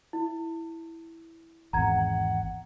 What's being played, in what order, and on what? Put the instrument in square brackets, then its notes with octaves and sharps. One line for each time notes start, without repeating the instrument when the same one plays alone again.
[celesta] E4
[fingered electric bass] G#1 E2 [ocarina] F#5 [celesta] A#5 G#6